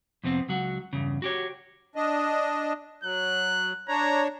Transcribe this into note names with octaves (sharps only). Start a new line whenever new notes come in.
F2 C3 B3 C4
C#2 F#3 F#4
E2 G2 C#3
F#4 G4 C#5
D4 D#5
F#3 F#6
D4 C#5 A#5